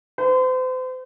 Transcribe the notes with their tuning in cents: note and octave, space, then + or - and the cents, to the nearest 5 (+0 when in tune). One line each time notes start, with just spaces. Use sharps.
C5 -40